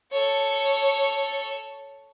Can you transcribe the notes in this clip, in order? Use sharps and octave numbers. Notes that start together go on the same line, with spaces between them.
A4 C#5